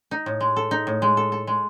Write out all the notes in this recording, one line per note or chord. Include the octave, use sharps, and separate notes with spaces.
D#4
A2
G#3
A4
D#4
A2
G#3
A4
A4
G#3